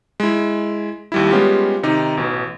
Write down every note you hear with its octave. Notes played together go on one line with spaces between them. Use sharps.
G#3 E4
D#2 G3 E4
G3 G#3 B3 C#4 F4 G4
C3 D#3 D#4 G4
A1 B2